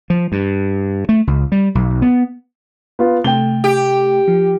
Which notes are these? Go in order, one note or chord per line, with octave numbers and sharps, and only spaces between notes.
F3
G2
A3
C#2
G3
B1
B3
B3 F4
C3 A3 G5 G7
G4
F3